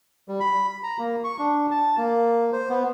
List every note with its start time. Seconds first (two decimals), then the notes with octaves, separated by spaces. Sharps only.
0.28 G3
0.40 B5
0.83 A#5
0.99 A#3
1.24 C#6
1.39 D4
1.71 A5
1.98 A#3
2.53 C5
2.69 B3